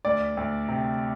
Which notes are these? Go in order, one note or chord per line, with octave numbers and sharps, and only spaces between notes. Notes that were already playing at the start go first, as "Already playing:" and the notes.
D2 D5
D2
C3